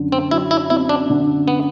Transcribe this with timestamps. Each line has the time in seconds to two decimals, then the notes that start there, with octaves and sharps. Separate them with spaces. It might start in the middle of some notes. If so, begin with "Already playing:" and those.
Already playing: F#2 D3
0.12 C4
0.31 F#3 E4
0.51 E4
0.70 C4 E4
0.89 D4
1.10 D3
1.48 B3